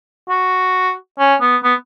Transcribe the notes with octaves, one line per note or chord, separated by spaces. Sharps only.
F#4
C#4
B3
B3